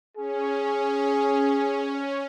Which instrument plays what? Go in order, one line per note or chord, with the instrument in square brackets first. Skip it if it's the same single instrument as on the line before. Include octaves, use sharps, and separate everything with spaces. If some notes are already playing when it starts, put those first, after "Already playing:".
[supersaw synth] C#4 [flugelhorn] G#4